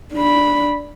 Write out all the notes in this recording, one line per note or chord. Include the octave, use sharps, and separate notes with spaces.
D4 B5